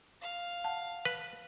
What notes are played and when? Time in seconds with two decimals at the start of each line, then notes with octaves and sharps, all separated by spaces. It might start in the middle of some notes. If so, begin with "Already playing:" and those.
0.22 F5
0.64 F#5 A5
1.05 B4